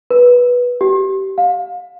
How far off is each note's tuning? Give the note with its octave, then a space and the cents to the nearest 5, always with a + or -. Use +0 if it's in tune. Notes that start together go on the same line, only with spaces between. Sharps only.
B4 -10
G4 -25
F5 +30